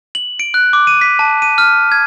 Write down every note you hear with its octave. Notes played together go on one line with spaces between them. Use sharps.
F#7
D7
F#6
D6
D#7
B6
A5
D#7
F6
G#6